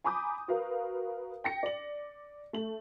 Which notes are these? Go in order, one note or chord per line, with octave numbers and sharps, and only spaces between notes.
G#5 A#5 B5 D6 D#6 G6
F#4 A#4 B4 F5
G5 A#6 C#7
D5 F#7
A3 F#7